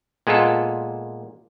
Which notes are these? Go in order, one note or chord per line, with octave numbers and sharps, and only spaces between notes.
A#2 G#3 B3 F4 A4